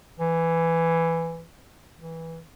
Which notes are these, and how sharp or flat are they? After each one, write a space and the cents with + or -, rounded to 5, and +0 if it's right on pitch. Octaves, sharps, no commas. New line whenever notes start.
E3 +10
E3 -10